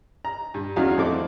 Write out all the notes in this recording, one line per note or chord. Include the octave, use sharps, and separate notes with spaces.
A#5
G2
E2 F#3 C#4 D#4 F#4 F5
F2 A3 C4 E4 D6